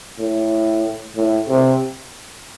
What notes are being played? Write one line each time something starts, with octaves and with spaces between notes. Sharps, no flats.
A2
A2
C3